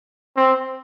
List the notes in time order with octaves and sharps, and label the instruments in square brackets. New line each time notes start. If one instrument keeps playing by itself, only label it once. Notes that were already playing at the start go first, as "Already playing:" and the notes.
[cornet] C4